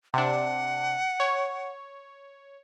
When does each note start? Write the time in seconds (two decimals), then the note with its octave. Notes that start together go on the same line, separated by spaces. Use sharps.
0.14 C3 D4 F#5
1.20 C#5